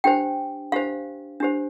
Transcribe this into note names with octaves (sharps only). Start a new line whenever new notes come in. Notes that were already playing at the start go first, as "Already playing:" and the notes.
D4 G4 C5 G5
D4 G4 C5 F5
D4 G4 C5